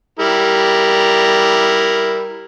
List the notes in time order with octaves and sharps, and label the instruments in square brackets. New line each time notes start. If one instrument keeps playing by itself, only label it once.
[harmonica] G3 E4 A#4